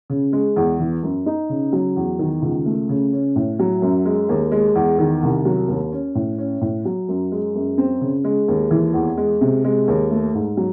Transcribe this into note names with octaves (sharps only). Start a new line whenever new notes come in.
C#3
G#3
E2
E3
F#2
D#4
C#3
F#3
E2
D#3
C#2
A3
C#3
C#4
A2
F#3
F#2
G#3
D#2
G#3
E2
D#3
C2
F#3
D#2
C#4
A2
C#4
A2
F#3
F#2
G#3
F#2
C4
C#3
G#3
D#2
E3
E2
G#3
C3
G#3
D#2
A3
G#2
F#3